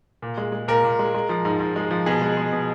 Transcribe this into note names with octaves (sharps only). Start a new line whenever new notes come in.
A#2
G#3
G#3
A#2 A#4
A#2
G#3
G#3
F3
G#2
G#2
G#3
F3
B2 G#4
G#3
G#3
B2